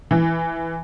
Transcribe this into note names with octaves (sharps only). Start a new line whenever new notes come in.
E3